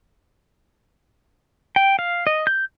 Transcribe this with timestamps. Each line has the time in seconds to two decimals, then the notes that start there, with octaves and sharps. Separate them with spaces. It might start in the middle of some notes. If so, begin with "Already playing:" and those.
1.76 G5
1.99 F5
2.27 D#5
2.47 G6